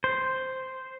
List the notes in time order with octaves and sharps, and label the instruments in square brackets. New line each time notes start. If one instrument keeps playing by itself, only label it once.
[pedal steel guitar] C5